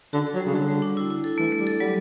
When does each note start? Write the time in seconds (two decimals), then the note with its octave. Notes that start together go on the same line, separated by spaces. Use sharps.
0.13 D3 F#4
0.27 A4
0.34 F#3
0.40 G3
0.47 C#3
0.55 D3 F#4
0.68 G3
0.82 D4
0.97 E4
1.10 E4
1.24 A4
1.38 E3 A3
1.52 A3
1.60 G3
1.67 A4
1.80 F#3 G3